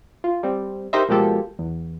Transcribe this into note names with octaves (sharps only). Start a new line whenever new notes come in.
F4
G3 C4
D#4 G4 A#4 C5 D#5 E5
B2 F3 G#3 A#3 G4 A4
E2